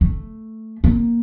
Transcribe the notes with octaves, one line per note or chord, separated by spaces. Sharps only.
A3
A#3